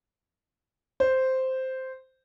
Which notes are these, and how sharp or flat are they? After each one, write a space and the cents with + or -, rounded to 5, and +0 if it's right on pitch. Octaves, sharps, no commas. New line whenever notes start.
C5 -5